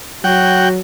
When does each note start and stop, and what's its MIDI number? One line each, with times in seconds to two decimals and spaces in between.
0.24 0.80 54
0.24 0.74 66
0.24 0.69 78
0.24 0.69 79